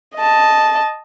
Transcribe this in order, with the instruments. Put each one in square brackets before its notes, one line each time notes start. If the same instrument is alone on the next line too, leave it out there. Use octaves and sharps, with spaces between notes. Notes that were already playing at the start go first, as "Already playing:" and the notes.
[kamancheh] D#5 A5